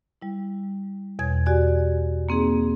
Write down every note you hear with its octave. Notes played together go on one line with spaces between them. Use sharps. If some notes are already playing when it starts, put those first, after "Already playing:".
G3 E4
E2 B2 C#5 G#6
F#4 G4 D5 G#5 G#6
A#3 C4 D#4 G#4